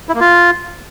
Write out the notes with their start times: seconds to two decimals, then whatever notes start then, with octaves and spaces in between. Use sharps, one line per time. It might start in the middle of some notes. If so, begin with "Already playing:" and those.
0.09 E4
0.14 A#3
0.20 F4